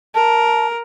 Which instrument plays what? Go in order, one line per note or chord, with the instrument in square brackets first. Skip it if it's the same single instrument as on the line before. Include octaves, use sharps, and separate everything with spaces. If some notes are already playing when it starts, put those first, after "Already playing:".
[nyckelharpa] A#4 [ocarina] A5